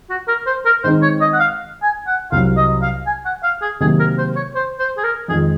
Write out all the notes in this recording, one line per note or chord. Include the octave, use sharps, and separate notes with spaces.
F#4
A#4
C5
A#4
D#3 G#3 C4 D#4 C5
C#5
D#5
F#5
F5
G#5
F#5
C2 C3 F#3 F5
D#5
F5
G#5
F#5
F5
G#4
C3 D#3 F#3 A#3 G#4
A#4
C5
C#5
C5
C5
G#4
A#4
F2 D#3 G#3 G#4